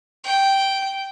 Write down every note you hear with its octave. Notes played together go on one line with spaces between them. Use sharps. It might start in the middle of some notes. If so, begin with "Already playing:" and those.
G5